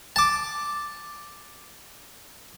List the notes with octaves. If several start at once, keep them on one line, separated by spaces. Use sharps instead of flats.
A5 D6